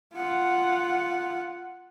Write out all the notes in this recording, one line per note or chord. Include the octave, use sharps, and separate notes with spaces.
F4 F#5